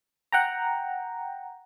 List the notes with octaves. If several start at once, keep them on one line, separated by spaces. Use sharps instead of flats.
F#5 G5 A#5